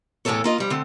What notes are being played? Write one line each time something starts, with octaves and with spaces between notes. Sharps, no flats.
E2 A2 C#3 F3 A4 C#5
A#3 F4 D#5
F3 G3
D3 A3 C4